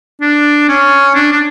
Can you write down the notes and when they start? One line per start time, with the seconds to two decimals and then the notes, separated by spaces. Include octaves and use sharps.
0.21 D4
0.69 C#4
1.15 D4
1.32 D4